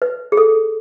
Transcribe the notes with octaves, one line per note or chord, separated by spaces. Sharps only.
B4
G#4
A4